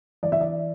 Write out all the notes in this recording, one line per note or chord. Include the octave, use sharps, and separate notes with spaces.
E3 D5
E5
D5